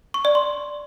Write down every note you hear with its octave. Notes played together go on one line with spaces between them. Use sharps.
C#6
D5
C6